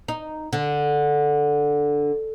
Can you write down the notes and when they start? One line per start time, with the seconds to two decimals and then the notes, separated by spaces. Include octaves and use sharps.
0.08 D#4
0.53 D3